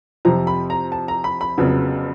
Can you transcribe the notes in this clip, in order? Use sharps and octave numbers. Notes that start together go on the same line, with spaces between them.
F2 C3 F3 A#5
B5
A#5
A5
A#5
B5
B5
F1 F2 C#3 F#3 B3